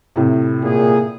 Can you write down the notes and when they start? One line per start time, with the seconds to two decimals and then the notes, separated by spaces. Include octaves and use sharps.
0.16 A2 C3
0.62 A#2 G#4